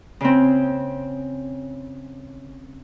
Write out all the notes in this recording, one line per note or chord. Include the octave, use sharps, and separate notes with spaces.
C#3 C4